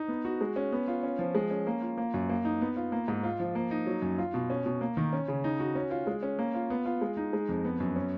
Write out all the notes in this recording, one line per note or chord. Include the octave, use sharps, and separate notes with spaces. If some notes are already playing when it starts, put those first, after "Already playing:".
Already playing: D#4
B3
F#4
G#3
C#4
B3
F4
C#4
F3
G#3
C#4
A#3
F4
A#3
F#2
A#3
D#4
B3
F4
A#3
G#2
F4
F3
A#3
D#4
F#3
F#2
F4
B2
C#4
B2
A#3
D#3
C#4
C#3
D#4
F#4
C#4
F4
G#3
C#4
A#3
F4
B3
F4
G#3
D#4
G#3
F2
B3
F#2
C#4